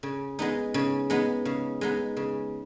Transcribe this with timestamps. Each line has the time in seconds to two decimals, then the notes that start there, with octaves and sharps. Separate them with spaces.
0.03 C#3
0.39 G#3 B3 D#4
0.74 C#3
1.10 G#3 B3 D#4
1.45 C#3
1.81 G#3 B3 D#4
2.17 C#3